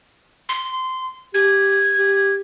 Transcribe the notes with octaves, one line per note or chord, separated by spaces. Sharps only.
C6
G4 G#6
G4